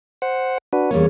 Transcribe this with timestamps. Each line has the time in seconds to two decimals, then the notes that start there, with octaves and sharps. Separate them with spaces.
0.22 C5 F#5
0.73 D4 F#4 B4
0.91 E2 G3 A#3 C#4 C#5